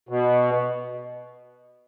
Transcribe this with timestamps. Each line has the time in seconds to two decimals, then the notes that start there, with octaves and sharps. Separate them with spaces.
0.09 B2